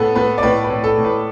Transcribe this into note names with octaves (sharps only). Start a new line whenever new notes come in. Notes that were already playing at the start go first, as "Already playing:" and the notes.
Already playing: A2 B3 A4 B4
B3 B4
D5
A2 B4
B4
A2
A4
A2
B4